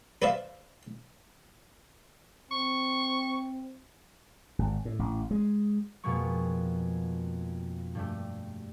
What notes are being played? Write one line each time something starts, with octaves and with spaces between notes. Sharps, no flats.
B4 C5 D5 E5 F5
C4 C#6
G#1
A2
A1
G#3
F2 B2 G#3 A#3 B3 C#6
G2 G3 A3